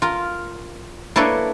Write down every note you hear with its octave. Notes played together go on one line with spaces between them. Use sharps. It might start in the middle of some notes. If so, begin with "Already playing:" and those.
F4 A#4
A#3 D4 E4 A4 B4 C#5